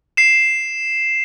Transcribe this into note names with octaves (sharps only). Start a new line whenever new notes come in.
C7 E7